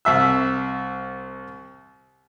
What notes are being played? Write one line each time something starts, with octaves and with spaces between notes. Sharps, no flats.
C2 E5 E6